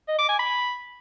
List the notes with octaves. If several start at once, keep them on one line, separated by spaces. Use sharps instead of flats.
D#5
D6
G#5
B5